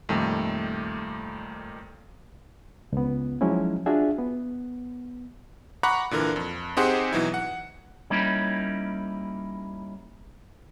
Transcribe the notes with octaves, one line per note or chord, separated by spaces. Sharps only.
F2 A#2 D#3 G3 A3
C#2 B3
F3 F#3 G#3 C#4 D#4 E4
D4 F4 F#4 G#4 E5
B3
F#5 A#5 B5 C#6 D6 F#6
A#2 D3 E3 A#4
F2
C4 D#4 G4 G#4 C5 F#5
B2 E3 F#3 D#4 E4
F#5
G3 A#3 C#4 D#4 E4 G4